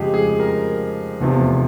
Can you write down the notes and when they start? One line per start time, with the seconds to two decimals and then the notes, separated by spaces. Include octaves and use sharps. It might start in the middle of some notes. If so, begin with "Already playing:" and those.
Already playing: F2 C#3 F3 G#3 G4 G#4
0.14 G#4
0.40 A#4
1.20 F1 E2 C3 F3